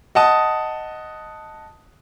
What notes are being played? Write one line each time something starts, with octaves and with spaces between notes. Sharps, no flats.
D#5 F#5 A5 D#6